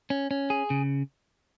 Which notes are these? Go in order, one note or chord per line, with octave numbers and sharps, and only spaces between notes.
C#4
C#4
G#4
C#3